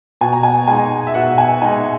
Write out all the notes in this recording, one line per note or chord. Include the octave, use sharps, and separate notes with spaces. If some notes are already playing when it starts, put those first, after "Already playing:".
B2 G#5
A#5
G#5
G#3 D#4 G#5
E5
B2 F#5
G#5
G#3 D#4 G#5